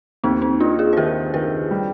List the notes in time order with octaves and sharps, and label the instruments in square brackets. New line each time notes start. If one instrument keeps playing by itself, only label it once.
[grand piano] D#2 [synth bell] C4 D#4
[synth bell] C4 D#4
[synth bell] D4 F4 [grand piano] D#4
[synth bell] F4 G#4
C5
[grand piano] D#3 [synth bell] G4 B4
[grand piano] D#3 [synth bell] G4 B4
[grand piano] G3